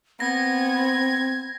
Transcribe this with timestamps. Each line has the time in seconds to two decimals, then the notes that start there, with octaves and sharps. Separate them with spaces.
0.20 B3 C4 G#6 A#6